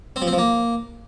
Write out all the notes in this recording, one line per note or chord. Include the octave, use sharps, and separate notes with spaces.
C4
F3
C4
F3
A#3